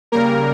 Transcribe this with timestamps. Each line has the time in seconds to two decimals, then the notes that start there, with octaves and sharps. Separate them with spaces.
0.12 C#3 G3 A#3 A#4